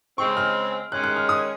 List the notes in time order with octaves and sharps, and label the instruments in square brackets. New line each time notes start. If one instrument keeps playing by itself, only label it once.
[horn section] C#3 G#3 C4 [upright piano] C#6
[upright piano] F6
[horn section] D#3 G#3 C#4 [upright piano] F#6
[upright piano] F#6
F6
D#6